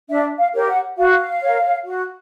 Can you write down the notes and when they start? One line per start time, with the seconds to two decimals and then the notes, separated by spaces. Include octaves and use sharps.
0.09 D4 E5
0.39 F5
0.53 G4 A#4 C#5
0.68 F#5
0.97 F#4 F5
1.42 A#4 C#5
1.86 F#4